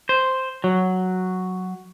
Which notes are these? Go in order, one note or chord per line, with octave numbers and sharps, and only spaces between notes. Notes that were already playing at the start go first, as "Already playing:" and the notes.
C5
F#3